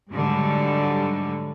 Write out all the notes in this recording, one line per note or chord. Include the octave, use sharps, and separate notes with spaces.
G#2 D3 F#3 G3